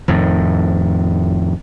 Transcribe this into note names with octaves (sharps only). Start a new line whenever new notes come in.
F2 A2 D#3